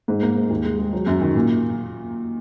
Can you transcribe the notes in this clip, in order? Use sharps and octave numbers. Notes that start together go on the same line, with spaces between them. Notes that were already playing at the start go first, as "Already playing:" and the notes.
G#2
A#3
G#2
D#2
G#3
G#3
F#3
F#2
D#3
A#2